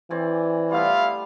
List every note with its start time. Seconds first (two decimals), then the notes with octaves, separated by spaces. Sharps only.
0.10 E3 C4 D5 G#5
0.71 G3 A3 B3 E4 F4 F5